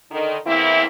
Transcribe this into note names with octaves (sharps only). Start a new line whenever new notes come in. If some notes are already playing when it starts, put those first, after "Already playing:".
D3 D#3 D#4
E2 E3 A#3 C4 E4